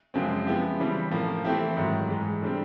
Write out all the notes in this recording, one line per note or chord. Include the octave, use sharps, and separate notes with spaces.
F#2 C#3 F3 G#3 C4
F3 G#3 B3 E4 G4
C#3 E3 G3 C4
A2 F3 A#3
E3 A3 C4 E4 G4
G#2 D#3 F#3
G#2 E3 G#3
D3 G3 C4